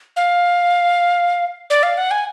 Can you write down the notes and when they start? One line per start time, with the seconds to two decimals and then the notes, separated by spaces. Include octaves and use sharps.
0.16 F5
1.70 D5
1.83 F5
1.98 F#5
2.11 G#5